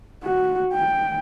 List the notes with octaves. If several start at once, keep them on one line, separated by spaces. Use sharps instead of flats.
F#4
G5